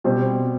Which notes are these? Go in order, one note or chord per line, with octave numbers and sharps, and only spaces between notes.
B2 G3 C4 G4 C5